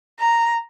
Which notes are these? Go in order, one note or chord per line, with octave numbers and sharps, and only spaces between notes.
A#5